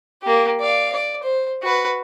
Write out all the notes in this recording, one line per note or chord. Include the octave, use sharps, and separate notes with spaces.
A#3 G4
D5 F5
D5
C5
F#4 B4